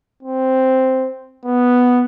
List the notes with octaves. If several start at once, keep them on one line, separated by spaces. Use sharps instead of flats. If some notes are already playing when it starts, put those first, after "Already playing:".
C4
B3